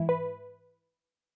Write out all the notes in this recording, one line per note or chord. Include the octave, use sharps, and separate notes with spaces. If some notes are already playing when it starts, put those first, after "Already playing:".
Already playing: G#2 E3 E4
B4